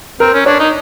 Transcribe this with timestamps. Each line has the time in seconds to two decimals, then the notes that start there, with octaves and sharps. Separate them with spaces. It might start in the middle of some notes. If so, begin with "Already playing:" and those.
0.20 C4 A#4
0.34 C#4
0.46 D4 C#5
0.60 D#4